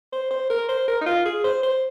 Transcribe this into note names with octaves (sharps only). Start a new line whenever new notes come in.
C5
C5
A#4
C5
A#4
D#4
F4
G#4
C5
C5